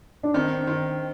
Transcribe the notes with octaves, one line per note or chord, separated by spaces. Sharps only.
D4
D#3 C4
D#3